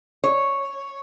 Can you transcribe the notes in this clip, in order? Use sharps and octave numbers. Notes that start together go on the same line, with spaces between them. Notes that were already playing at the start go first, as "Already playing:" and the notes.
C#5